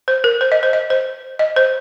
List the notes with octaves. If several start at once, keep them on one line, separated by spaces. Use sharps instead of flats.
C5
A#4
C5
D#5
C5
D#5
C5
D#5
C5